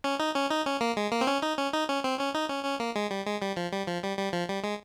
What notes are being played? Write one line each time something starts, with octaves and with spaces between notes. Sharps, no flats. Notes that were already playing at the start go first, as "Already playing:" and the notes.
C#4
D#4
C#4
D#4
C#4
A#3
G#3
A#3
C4
C#4
D#4
C#4
D#4
C#4
C4
C#4
D#4
C#4
C#4
A#3
G#3
G3
G#3
G3
F3
G3
F3
G3
G3
F3
G3
G#3